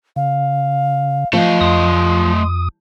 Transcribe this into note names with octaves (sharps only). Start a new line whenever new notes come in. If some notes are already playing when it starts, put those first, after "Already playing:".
C#3 F5
F3 A3 D#5
F2 C6 D#6